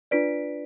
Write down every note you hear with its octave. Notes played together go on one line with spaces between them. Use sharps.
D4 F4 B4 D5 B6 D7